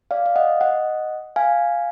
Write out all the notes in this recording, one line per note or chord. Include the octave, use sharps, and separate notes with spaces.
D5 F5
F5
D#5 F#5
D#5 F#5
F5 G#5